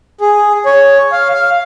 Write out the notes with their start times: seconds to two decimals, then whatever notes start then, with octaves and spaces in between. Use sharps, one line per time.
0.21 G#4
0.66 C#5
1.12 F5
1.34 F5